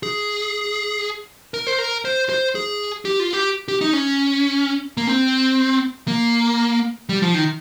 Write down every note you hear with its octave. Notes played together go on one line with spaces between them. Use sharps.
G#4
A#4
C5
A#4
C5
C5
G#4
G4
F4
G4
G4
D#4
C#4
A#3
C4
A#3
G3
F3
D#3